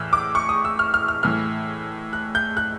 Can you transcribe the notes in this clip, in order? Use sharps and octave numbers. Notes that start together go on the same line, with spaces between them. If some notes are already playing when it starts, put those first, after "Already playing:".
Already playing: A2 E3 E6 F6
D6
C#6
D#6
E6
F6
F6
F6
A2 E3 F6
F#6
G6
F#6